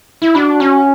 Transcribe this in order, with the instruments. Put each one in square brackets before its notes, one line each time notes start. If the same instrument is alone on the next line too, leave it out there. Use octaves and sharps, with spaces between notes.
[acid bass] E4
[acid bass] D4 [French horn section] F#4
[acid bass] C#4